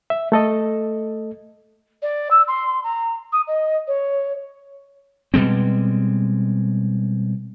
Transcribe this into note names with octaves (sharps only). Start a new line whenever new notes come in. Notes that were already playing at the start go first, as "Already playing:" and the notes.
E5
A3 A4 D#5
D5
E6
C6
A#5
D#6
D#5
C#5
B2 G3 G#3 C4